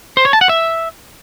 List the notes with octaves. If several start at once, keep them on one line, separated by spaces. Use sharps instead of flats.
C5
C#5
A5
F#5
E5